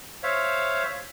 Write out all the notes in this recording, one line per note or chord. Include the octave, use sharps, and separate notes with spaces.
C5 C#5 E5 F5